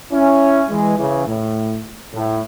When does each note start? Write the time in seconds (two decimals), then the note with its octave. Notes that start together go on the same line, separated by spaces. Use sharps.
0.11 C#4 E4
0.69 E3 G#3
0.97 C#3 E3
1.27 A2
2.13 A2